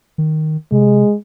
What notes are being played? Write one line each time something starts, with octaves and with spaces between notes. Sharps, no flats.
D#3
C3 G#3